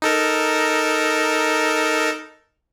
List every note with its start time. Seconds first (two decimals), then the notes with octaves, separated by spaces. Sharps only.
0.02 D#4 A4 A#4